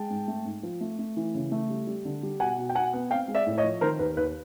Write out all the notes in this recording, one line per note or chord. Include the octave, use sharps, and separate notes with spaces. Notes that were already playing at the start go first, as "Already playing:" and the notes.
Already playing: G#3 G5 A5
G#2
A3
G#2
F3
A3
A3
E3
C#3
A3
G3
G3
D3
G3
B2 F#5 G#5
B2
G5
B2 F#5 G#5
B3
C4 F5 G5
G#3
D5 E5
A2
C#5 D#5
F3
D#3 A#4 C5
D#2 B4
D#2 B4